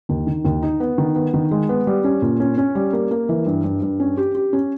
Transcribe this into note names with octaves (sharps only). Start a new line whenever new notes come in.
D#2
D#3
D#2
D#4
B3
D#3
B3
D#3
G#3
B3
G3
C#4
A#2
C#4
C#4
G3
A#3
A#3
E3
G2
G2
G2
C#4
G4
G4
C#4